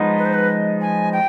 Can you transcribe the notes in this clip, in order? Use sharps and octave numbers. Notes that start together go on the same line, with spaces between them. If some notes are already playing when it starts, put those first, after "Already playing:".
Already playing: F3 G#3 B3 D#4
B4
C5
B4
G#5
G5